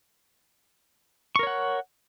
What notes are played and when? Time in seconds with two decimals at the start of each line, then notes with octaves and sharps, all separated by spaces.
1.36 C#6
1.39 A#4
1.43 C#5
1.47 F#5